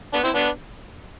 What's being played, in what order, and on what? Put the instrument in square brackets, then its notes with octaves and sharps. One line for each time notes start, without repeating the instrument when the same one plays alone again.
[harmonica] B3 D4
C4 E4
B3 D4